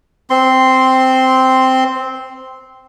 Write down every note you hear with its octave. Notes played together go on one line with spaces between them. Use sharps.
C4 C6